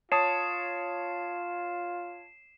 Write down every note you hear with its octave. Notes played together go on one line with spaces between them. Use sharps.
F4 C#5 A5 D#6 C7 E7